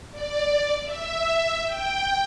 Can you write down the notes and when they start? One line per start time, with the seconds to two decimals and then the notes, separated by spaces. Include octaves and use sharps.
0.11 D5
0.83 E5
1.62 G5